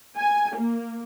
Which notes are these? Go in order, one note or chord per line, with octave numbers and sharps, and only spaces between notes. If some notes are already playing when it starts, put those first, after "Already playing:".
G#5
A#3